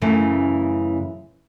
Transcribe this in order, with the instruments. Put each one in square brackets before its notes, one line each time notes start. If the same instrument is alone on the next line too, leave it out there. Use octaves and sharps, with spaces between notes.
[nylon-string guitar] F#2 C#3 E3 A3